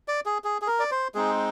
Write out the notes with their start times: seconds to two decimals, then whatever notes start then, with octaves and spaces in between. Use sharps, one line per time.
0.08 D5
0.26 G#4
0.44 G#4
0.62 G#4
0.67 A#4
0.79 D5
0.91 C5
1.15 G#3 C4 D#4 G#4